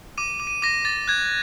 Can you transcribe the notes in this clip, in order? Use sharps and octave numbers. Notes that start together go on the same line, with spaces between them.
D6 D#7
D6
D#7
D6 A#6
D6 A6
F#6 G#6